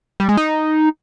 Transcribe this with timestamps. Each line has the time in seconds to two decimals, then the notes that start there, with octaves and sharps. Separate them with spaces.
0.20 G3
0.29 G#3
0.37 D#4